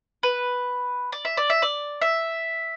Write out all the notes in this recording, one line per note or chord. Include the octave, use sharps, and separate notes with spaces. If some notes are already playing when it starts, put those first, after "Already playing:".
B4
D5
E5
D5
E5
D5
E5